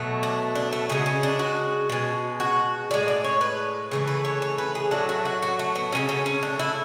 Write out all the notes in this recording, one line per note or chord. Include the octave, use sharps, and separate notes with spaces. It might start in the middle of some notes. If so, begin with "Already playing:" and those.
Already playing: B2 F#3 A3
D4
D4
A3
C#3 G#3 B3
C#4
D4
F#4
B2 G#3
F#4
A2 G#3 D5
D5
C#5
B4
C#3 E3 A3
B4
C#5
C#5
B4
G#4
A2 F#3 A3 D4
F#4
F#4
F#4
A3
B3
C#3 E3 A3 C#4
C#4
C#4
D4
E4